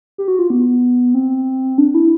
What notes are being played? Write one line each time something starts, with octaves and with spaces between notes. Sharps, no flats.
G4
F#4
F4
B3
C4
D4
E4